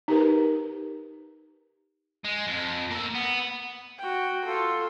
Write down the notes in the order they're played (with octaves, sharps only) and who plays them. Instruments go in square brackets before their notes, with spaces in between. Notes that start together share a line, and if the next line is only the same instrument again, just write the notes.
[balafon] D#4 G4 A#4 B4
[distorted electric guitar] G#3
F2
A#3 E5
B3
[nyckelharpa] F#4 G5
F4 A4